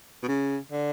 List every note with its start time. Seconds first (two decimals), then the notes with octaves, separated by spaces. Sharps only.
0.23 B2
0.28 C#3
0.71 D3